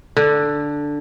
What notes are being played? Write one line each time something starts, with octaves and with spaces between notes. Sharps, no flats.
D3